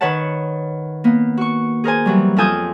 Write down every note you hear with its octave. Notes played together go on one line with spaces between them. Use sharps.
D#3 B4 C#5 F#5 A5
A#3 B3
F#4 C#6
G#4 A#4 C5 G#5
E3 F#3 G3
F2 F4 A4 G#5 D#6 G6